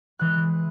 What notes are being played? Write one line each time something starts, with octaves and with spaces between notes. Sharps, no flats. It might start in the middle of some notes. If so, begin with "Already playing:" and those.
E3 G#3 F#6